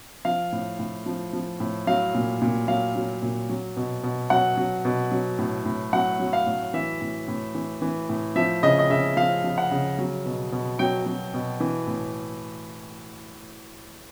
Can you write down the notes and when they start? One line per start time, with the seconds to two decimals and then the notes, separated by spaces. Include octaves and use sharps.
0.25 F3 F5
0.52 A2
0.79 A2
1.06 F3
1.33 F3
1.60 A2
1.87 F#3 F5
2.14 A#2
2.41 A#2
2.68 F#3 F5
2.95 F#3
3.22 A#2
3.49 F#3
3.77 B2
4.03 B2
4.30 F#3 F#5
4.57 F#3
4.85 B2
5.12 F#3
5.38 A2
5.65 A2
5.93 F#3 F#5
6.19 F#3
6.33 F5
6.47 A2
6.74 E3 E5
7.01 A2
7.28 A2
7.55 E3
7.82 E3
8.09 A2
8.36 F3 E5
8.63 C#3 D#5
8.79 D#5
8.90 C#3 E5
9.17 F3 F5
9.44 F3
9.58 F#5
9.71 C#3
9.98 F#3
10.25 B2
10.52 B2
10.79 F#3 G5
11.06 F#3
11.34 B2
11.60 E3
11.87 A2